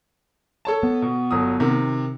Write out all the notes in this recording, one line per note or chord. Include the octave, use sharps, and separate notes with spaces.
A4 C#5 A5
B3
B2
G1 F#3 D#6
C3 D#3